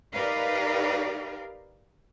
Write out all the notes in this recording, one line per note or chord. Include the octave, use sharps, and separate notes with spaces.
D#4 G4 A#4 B4 D5 F5